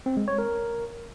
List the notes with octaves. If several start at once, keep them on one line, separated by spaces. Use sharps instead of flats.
C4
G#3
C#5
A#4